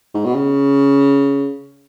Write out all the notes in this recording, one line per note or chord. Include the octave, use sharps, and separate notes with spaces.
G#2
B2
C#3